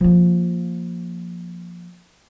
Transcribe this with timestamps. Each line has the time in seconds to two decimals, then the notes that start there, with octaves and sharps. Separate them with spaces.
0.01 F3 A#3